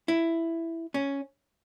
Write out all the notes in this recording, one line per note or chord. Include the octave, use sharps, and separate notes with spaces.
E4
C#4